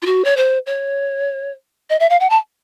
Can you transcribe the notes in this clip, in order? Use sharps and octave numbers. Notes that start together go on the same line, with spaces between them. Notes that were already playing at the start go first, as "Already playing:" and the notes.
F4
F#4
C#5
C5
C#5
D#5
E5
F5
F#5
A5